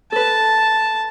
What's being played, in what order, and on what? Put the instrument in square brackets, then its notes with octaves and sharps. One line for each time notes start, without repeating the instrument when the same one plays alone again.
[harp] A4 B4 [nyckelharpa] A5